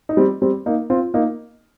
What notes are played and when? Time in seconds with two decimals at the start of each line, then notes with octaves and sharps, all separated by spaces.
0.09 D#4
0.17 G3 C4
0.42 G3 C4
0.66 A#3 D#4
0.90 C4 F4
1.14 A#3 D#4